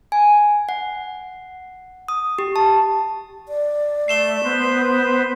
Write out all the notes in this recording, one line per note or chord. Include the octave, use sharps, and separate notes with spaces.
G#5
F#5
D#6
G4
A5
D5
A3 C7 E7 G7
B3 B4 C5